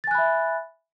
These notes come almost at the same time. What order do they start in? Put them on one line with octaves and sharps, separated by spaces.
A6 G#5 F#6 B5 E5